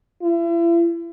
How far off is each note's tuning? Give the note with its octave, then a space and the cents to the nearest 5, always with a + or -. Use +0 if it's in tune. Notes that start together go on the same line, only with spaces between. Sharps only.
E4 +40